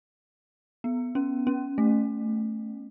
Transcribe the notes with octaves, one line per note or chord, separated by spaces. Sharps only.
B3
C#4
C#4
A3